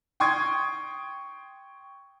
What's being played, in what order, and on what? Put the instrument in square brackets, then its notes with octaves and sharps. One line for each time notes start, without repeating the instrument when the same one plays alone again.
[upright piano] G5 C6 C#6 D#6 G#6